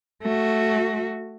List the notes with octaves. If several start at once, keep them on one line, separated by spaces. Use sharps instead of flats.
A3 F#4